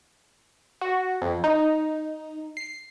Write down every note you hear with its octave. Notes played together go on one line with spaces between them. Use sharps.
F#4
F2
D#4
C7